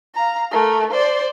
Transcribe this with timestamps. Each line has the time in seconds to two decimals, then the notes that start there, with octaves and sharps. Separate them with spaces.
0.14 F5 A#5
0.51 A3 A#4
0.90 C5 D5